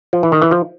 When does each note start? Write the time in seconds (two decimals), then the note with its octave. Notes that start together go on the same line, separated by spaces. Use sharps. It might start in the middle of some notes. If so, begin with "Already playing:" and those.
0.13 F3
0.23 E3
0.32 D#3
0.42 E3
0.51 F3